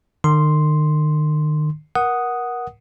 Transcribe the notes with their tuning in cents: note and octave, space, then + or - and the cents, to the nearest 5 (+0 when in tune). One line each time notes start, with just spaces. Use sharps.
D#3 -40 C6 +0
A#4 +30 F#5 +0 D#6 +0